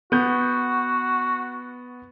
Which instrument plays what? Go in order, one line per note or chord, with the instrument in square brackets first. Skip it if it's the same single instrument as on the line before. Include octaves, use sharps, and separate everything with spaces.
[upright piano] B3 G6 [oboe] F#4